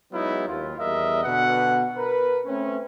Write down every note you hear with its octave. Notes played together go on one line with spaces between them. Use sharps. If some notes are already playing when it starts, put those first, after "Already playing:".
F#3 G#3 B3 D#4 E4
D#2 F4
E2 G3 A#4 D#5 E5
B2 D3 B4 F#5
A#4 B4
A3 C4 C#4